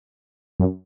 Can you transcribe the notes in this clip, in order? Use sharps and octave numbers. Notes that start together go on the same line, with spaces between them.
F#2